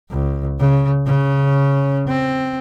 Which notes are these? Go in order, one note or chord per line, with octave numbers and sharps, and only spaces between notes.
C#2
C#3
C#3 C#4
C4